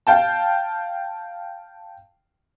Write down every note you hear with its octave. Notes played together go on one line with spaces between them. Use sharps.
F5 G5 A5